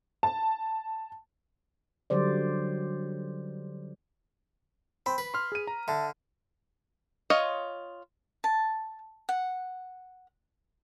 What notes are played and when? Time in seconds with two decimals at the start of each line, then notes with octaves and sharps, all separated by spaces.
0.23 A5
2.10 D3 F#3 G3 C5 D5
5.06 C4 B5
5.18 B4
5.34 C6 F6
5.52 G#4 D#7
5.67 A#5
5.88 D3 E5 A5
7.30 F4 C#5 D#5
8.44 A5
9.29 F#5